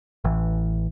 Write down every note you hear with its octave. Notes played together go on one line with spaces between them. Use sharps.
A1 E3